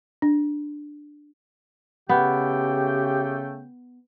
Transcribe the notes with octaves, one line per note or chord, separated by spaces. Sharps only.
D4
C#3 A3 B3 G4 G5